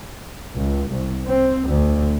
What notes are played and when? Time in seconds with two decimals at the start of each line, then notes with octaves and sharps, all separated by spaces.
0.57 C#2
0.90 C2
1.26 C4
1.68 D2